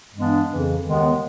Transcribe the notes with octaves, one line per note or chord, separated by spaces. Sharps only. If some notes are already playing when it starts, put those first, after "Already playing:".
G2 E3 G#3 B3 D4
F2 C#3 E3
D#2 D#3 G#3 B3